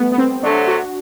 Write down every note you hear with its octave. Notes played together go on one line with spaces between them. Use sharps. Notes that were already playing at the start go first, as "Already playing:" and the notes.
Already playing: G3 A3 B3
B3
C4
C3 F#3 A3 D4
F#4